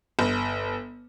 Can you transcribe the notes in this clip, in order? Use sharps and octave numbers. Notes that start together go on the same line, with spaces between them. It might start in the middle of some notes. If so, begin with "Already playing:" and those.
G1